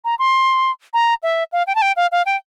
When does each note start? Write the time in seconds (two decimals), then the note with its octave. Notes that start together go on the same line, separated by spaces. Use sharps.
0.05 A#5
0.19 C6
0.94 A#5
1.23 E5
1.52 F5
1.67 G5
1.75 A5
1.82 G5
1.96 F5
2.12 F5
2.26 G5